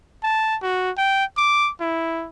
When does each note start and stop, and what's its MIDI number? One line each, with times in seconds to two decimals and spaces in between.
0.23 0.57 81
0.62 0.91 66
0.98 1.24 79
1.37 1.70 86
1.80 2.28 64